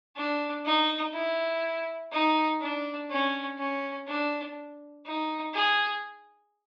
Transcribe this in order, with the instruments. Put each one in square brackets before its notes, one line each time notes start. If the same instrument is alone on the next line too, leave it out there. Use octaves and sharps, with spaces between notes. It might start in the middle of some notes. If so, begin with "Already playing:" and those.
[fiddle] D4
D#4
E4
D#4
D4
C#4
C#4
D4
D#4
G#4